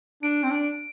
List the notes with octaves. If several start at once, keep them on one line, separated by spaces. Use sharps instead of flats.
D4 D7
C4
D4